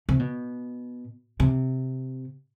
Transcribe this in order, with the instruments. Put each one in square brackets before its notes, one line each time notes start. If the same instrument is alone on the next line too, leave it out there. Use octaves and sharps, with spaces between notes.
[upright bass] C3
B2
C3